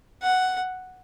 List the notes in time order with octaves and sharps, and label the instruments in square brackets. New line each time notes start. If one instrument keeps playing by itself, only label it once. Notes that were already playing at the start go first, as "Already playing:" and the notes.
[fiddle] F#5